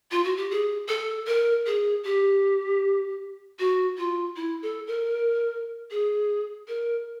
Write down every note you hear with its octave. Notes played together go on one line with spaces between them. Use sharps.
F4
F#4
G4
G#4
A4
A#4
G#4
G4
F#4
F4
E4
A4
A#4
G#4
A#4